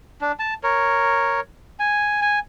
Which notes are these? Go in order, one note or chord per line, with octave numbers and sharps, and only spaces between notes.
D4
A5
A#4 C#5
G#5
G#5